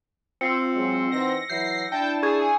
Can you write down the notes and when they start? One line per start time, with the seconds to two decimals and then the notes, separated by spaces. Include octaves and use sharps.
0.41 C4 F4 E6 C7 C#7
0.75 F#3 G#3
1.11 E3 D#4 F#4 A#6
1.50 E3 F#3 E4 G6 C7
1.92 D4 E4 G5 A5
2.23 G#4 C#6 G#6